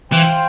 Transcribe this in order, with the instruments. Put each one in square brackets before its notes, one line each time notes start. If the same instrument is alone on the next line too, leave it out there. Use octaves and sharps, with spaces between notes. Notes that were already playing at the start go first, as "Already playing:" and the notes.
[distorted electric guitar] E3 [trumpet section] F4 C5 G5